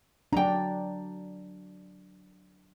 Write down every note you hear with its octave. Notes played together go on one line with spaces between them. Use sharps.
F#3 D4 G5 A#5